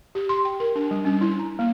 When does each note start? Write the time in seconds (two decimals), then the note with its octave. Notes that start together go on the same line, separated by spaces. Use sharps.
0.15 G4
0.29 C6
0.45 G5
0.60 A#4
0.75 D4
0.91 G3
1.05 C#4
1.21 E4
1.39 A#5
1.59 A#3